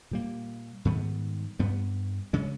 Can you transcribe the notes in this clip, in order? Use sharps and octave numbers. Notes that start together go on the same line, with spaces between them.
A#2 G3 A#3
G#2 D#3 G3 B3
G2 G3 B3
C#3 G#3 C#4